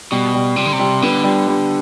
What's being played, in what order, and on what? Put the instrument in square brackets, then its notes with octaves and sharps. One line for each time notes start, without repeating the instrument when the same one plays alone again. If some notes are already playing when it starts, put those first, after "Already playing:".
[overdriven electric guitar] B2 [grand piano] G3
[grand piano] G3
[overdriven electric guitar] C3 [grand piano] G3
[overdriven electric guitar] D3
C3
[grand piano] G3
[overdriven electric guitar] D3 [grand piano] B3
[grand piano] G3
G3